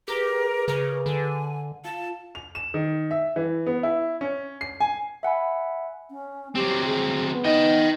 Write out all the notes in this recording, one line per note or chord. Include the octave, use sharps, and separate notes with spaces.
G4 G#4 A#4 B4 D6
C#3 A#4
D3 G#5
F4 F5 A5
F7
E7
D#3
E5
E3
B3
E4
C#4
C7
G#5
E5 F#5 G#5 B5
C#4
F#3 C4 G4
G#4
B3
D#4 D#5 G5